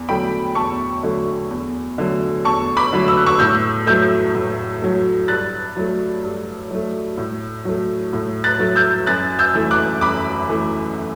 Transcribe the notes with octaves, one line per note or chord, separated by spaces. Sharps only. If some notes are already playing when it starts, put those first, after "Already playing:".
Already playing: E2
D3 F#3 A3 G5 B5
E2 A5 C#6
D3 F#3 A3
E2
D3 F#3 A3
E2 A5 C#6
B5 D6
D3 F#3 A3
E6
F#6
C#6 E6
A2 E6 G6
F#3 A3 E6 G6
A2
F#3 A3
G2 F#6 A6
F#3 A3
G2
F#3 A3
A2
F#3 A3
A2
F#6 A6
F#3 A3
E6 G6
F#2 F#6 A6
E6 G6
E3 A3
D6 F#6
F#2 B5 D6
E3 A3